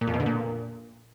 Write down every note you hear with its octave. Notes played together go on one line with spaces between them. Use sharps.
A#2
F2
B2
D3
A#2